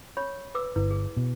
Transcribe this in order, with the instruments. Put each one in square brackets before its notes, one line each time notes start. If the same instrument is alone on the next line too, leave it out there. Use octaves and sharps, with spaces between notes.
[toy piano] C#5 B5 C#6
B4 D6 E6
[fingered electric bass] G1 [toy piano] E4 B4
[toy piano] G#4
[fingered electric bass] B2